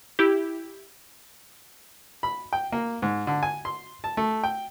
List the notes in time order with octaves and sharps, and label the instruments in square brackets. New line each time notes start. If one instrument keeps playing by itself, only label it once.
[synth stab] E4 G4
[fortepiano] B5
G5
A#3
G#2
D3
G#5
C6
A5
A3
G5